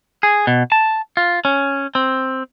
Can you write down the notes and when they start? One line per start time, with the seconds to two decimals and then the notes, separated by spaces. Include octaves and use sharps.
0.23 G#4
0.47 B2
0.72 A5
1.17 F4
1.45 C#4
1.95 C4